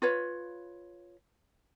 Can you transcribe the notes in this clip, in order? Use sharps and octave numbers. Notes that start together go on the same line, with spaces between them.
F4 B4 C#5